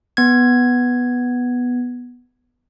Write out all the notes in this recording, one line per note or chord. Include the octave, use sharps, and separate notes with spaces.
B3 G#6